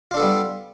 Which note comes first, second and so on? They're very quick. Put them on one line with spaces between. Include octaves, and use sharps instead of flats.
F4 D4 A4 B3 G3